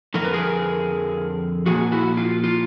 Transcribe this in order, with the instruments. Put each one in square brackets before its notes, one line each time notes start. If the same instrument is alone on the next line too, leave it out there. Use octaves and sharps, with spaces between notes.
[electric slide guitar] F2 D3 F3 A#4
B4
G#4 A#4
A#2 F3 A#3 F#4 G#4
E4 F#4
F4
F4